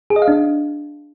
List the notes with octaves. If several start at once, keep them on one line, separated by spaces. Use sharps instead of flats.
G#4
D#5
F5
D4